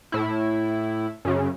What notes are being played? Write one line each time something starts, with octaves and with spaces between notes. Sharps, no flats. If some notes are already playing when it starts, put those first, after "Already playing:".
A2 E4
F#2 C#3